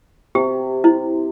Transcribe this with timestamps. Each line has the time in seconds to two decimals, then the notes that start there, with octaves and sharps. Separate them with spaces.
0.35 C3 G4
0.84 E4